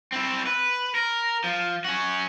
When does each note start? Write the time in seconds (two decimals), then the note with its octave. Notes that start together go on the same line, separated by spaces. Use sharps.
0.12 C4 E4
0.46 B4
0.95 A#4
1.44 F3
1.84 C#4 F#4